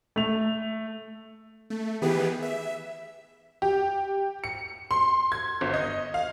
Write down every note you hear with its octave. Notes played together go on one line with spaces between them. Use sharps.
A3 F7
A3
D#3 E3 B3 G4 G#4 B4
E5
G4
C#7
C6
G#6
G1
D#5
F5